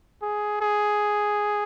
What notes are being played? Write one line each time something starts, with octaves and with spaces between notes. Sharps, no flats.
G#4
G#4